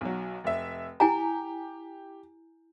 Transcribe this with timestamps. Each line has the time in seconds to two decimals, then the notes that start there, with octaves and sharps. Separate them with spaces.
0.01 B1 F#3
0.44 F1 E5
1.00 E4 G4 G#5 A#5